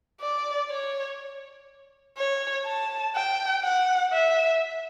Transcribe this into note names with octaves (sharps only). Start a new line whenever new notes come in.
D5
C#5
C#5
A5
G5
F#5
E5